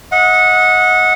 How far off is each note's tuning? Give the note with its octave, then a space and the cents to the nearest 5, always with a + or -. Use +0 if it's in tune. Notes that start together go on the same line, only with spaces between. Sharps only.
D#5 +25 F#5 -20